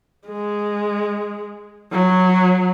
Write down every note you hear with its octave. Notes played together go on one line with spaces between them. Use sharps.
G#3
F#3